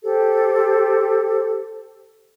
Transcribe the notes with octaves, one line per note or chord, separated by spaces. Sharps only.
G4 A4 C5